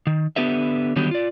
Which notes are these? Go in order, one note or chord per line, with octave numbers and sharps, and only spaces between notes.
D#3
D3 B3 G4 B4 E5
D3 D#3 F#3 G3 B3 G4
F4 D5